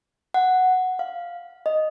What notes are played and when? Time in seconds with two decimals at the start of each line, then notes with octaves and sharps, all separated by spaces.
0.34 F#5
0.99 F5
1.66 D#5